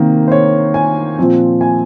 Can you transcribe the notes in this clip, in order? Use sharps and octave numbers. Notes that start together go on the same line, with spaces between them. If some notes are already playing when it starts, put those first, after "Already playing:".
Already playing: C3 D#3 A#3
C5
C#5
G#5
A#2 F3 C4
G#5